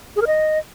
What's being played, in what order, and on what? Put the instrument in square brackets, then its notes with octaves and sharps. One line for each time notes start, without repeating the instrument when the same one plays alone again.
[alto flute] G#4
A#4
D#5